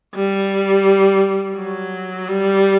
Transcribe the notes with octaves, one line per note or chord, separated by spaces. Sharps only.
G3
F#3
G3